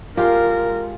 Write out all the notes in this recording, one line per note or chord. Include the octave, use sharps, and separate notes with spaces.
G#3 F4 G4 A#4